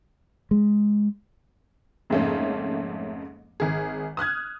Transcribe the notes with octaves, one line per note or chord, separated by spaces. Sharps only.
G#3
F2 G#2 C#3 A3 A#3 C#4
G#1 G#4
D#6 F6 F#6 G#6